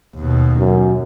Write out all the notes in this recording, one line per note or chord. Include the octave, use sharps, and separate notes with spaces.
D#2 B2
F#2